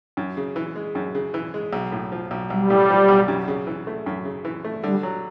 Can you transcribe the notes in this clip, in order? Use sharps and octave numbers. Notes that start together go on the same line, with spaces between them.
F#2
C#3
E3
G#3
F#2
C#3
E3
G#3
B1
A2
F3
B1
B1 G3
A2
F3
B1
F#2
C#3
E3
A3
F#2
C#3
E3
A3
D3 G3
F#3